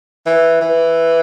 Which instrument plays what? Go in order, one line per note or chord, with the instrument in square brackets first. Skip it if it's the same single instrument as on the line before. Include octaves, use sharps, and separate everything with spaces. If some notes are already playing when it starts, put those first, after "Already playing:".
[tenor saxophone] E3
E3